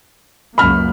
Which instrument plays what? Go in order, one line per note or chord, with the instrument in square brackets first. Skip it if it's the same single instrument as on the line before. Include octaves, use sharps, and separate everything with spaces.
[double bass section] C#2 F#2 A#3 [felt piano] B5 F6